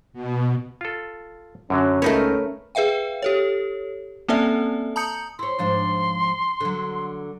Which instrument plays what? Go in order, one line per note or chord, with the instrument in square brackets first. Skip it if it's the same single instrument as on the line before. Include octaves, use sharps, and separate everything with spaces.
[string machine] B2
[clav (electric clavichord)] F4 A4
[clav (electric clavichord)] F#2 D3 F#3 [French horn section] C#4
[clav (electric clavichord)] C#2 D#4 C#5 [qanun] A3 A#4 B4
[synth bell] G#4 B4 E5 F5 G5
G4 A4 C#5
A#3 C4 C#4 A4 D5 E5
A5 A#5 D#6 G6 C#7
[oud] E4 C#5 [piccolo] C6
[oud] G#2 F3 D4
D3 F#3